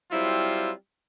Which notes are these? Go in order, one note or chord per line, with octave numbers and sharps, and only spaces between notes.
F#3 G3 C4 E4 F4